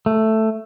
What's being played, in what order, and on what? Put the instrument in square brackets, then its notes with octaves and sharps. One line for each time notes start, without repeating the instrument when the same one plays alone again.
[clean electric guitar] A3